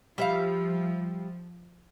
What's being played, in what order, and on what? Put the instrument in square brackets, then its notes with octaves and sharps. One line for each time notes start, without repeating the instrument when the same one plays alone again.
[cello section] F3 [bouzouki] G3 E5 F5